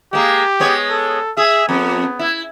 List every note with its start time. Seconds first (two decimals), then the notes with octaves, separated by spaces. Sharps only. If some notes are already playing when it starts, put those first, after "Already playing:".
0.13 G#3 A#3 G4
0.60 G#3 B3 C#5
0.90 A4
1.37 G#4 E5
1.69 F2 B3
2.19 E4